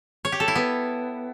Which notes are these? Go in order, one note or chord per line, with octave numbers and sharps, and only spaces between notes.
C#5
G4
A4
E4
B3